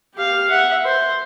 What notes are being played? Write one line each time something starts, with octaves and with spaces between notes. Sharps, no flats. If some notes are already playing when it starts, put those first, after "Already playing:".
G4 F5
E5 F#5
C5